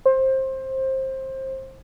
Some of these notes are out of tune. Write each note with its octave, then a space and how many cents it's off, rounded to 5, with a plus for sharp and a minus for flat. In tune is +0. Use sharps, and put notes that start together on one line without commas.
C5 +20